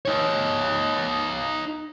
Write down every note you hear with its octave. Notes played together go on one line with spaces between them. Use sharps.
D#4 C#5